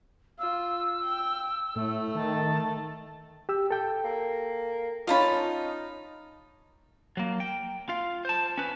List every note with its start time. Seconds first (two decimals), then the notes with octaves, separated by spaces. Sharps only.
0.39 F4 E6
1.02 G5
1.76 A2 A3
2.15 D#3 A5
3.49 G4 E6
3.71 A4 G5
4.05 A#3
5.07 C#4 D#4 F4 F5 A5 B5
7.17 F#3 A#3
7.40 G5
7.89 F4 F5
8.25 C5 A5
8.58 C#4 B4